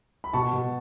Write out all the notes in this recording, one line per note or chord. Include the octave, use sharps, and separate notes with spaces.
B5
B2 A5 C#6
B2